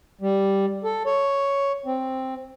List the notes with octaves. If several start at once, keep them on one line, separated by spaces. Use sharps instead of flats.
G3
A4
C#5
C4